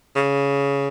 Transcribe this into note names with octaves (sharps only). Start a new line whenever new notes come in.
C#3